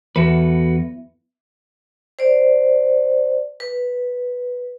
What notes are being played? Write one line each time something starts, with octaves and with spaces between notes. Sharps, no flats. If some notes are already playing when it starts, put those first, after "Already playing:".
E2 F#4 A4 B4
C5 D5
B4